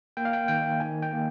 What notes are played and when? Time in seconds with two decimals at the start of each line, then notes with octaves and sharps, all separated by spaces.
0.17 A#3 G5
0.25 F5
0.33 G5
0.48 D#3 G5
0.80 D#3 G#5
1.02 G5
1.13 A#3